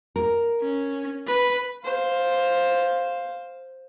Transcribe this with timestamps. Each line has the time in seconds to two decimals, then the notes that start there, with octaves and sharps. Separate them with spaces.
0.16 A#4
0.61 C#4
1.27 B4
1.84 C5 F5